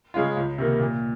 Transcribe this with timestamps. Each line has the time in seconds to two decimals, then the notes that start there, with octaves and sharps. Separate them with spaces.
0.14 C#3 G#3 C#4 F4
0.37 C#2
0.58 C3 D#3 A#3
0.80 A#2